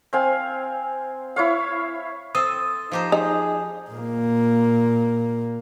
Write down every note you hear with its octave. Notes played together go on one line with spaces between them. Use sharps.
C4 F5 G#5
E4 C#5 F5
C4 A4 C5 D#6
F3 D#4 G4 C5
D#4 G#4
A#2 A#3